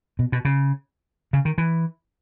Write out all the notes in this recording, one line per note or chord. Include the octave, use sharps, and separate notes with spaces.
B2
B2
C#3
C#3
D#3
E3